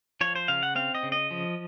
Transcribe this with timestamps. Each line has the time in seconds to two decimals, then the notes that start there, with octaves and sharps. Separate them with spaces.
0.21 F3 C#5
0.36 C5
0.48 C#3 F5
0.63 F#5
0.75 C4 F5
0.95 D#5
1.03 C#3
1.12 D#5
1.31 F3